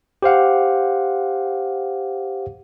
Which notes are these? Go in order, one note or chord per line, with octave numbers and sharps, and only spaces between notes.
G4 C5 F5 F#5